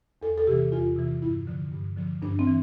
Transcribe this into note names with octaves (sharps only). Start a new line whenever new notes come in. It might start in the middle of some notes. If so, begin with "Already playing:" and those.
E2 A4
A4
C3 E3 G4
E2 F4
C3 E3
G2 E4
D3 F3
G2
D3 F3
G2 D4
C4
E3